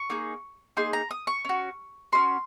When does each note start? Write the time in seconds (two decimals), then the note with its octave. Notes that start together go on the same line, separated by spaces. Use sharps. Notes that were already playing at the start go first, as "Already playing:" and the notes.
Already playing: C#6
0.10 A#3 D#4 G#4
0.77 A#3 D#4 G#4 C6
0.93 A#5
1.11 D#6
1.27 C#6
1.45 C#4 F#4
2.12 C#4 F#4 C6